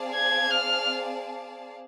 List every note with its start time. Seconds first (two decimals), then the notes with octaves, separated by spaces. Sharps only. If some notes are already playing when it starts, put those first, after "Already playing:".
Already playing: C4 G#4 D5 F5 A5
0.14 G#6
0.50 F6